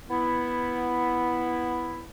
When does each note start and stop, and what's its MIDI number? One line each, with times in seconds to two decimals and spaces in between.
0.09 2.09 59
0.09 2.09 64